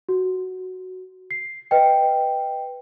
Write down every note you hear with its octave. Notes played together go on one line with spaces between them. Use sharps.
F#4
C7
B4 D#5 G5